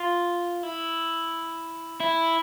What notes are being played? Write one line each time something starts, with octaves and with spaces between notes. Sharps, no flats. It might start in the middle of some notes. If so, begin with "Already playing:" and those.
Already playing: F4
E4
E4